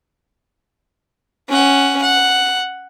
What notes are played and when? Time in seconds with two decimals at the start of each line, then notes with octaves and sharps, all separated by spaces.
1.49 C#4 F#5
2.02 F#5